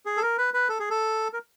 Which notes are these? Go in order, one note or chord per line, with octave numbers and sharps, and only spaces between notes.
G#4
A4
A#4
B4
B4
A4
G#4
A4
A#4